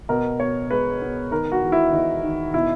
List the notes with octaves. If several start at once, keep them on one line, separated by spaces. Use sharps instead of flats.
B2 A#4
B2 C#5
G#3 B4
B3
D#3 A#4
F#4
E2
E4
E2 D#4
D#3
B2 E4